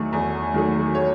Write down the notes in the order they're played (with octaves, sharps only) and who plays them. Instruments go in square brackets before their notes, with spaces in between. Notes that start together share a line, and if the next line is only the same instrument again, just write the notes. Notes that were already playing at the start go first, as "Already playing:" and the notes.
Already playing: [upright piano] E2 D#3 F#3 A3
E2
D#3 F#3 A3
C#5